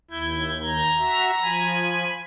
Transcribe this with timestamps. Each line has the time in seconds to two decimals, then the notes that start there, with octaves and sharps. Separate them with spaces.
0.11 D#2 E4 G6 G#6
0.61 A#5
0.97 F#4 E5
1.40 F3 G#5 B5